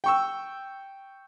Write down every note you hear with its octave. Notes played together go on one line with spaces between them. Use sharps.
G5 C#6 E6